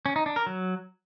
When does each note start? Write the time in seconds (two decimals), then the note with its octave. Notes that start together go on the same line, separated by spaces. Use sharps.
0.06 C#4
0.16 D#4
0.26 D4
0.36 A#4
0.47 F#3